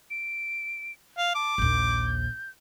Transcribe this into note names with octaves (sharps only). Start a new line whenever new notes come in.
D7
F5
A5 D6
A#1 D#2 G6